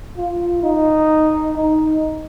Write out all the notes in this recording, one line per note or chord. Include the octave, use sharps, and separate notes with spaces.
F4
D#4
D#4